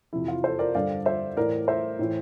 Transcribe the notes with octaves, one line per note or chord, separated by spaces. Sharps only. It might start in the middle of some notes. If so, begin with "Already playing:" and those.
F2 C3 E3 E4
F4
A4 C5
A#4 D5
G2 D3 D5 F5
C5 E5
A2 E3 A#4 D5
C5 E5
A2 E3